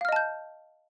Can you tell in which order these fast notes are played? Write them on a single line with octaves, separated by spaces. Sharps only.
F5 F6 D#5 A5 G6